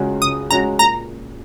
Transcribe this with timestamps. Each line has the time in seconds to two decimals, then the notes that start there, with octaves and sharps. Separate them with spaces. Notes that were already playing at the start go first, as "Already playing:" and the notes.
Already playing: C#2 C#3 G#3 C#4 F#4
0.22 C#2 D#6
0.51 C#3 G#3 C#4 F#4 A#5
0.79 A#2 A#5